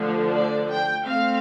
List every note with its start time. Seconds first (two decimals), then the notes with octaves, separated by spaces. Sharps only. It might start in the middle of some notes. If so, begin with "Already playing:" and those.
Already playing: D3 F3 A3 D4
0.33 D5
0.70 G5
1.07 A3 C4 F5